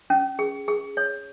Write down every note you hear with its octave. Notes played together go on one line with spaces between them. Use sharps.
C#4
G#4
G#4
C#5